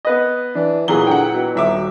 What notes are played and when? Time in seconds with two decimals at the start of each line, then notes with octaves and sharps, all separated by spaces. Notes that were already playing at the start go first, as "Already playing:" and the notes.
0.05 B3 B4 D#5
0.55 E3 D4
0.88 B1 A#2 E3 F#3 G#4 A#4 G7
1.07 D3 F#5 G5
1.34 B2
1.55 D#1 E5 D6